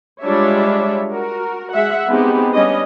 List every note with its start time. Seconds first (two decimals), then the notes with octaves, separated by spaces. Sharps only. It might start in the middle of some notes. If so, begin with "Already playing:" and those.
0.23 G3 G#3 D4 F4 C#5 E5
1.12 F#4 A#4
1.73 G#3 E5 F#5
2.07 G#3 B3 C4 D#4 G4
2.54 G3 B3 C#4 D4 D#5